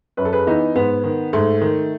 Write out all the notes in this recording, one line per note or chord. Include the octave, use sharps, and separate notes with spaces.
F#2 B4
A4
G#4 B4
E3 B3 D#4
G#2 B3
D#3
G#2 A3
D#3